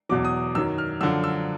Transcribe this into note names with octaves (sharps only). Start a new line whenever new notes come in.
E2 B2 F#3 D6
D#6
F#2 D#3 F#3 E6
F6
F#2 D3 F3 E6
E6